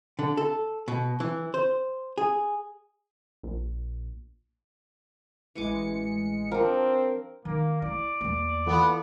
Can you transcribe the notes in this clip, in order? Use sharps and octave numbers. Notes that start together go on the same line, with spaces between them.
D3
A4
B2
E3
C5
G#4
A#1
A1 E3 G#3 G#5 D6 C#7
F3 C4 D4 A#4
D#3 A#3
E4 D5
E2 A#3
E3 B3 F4 A4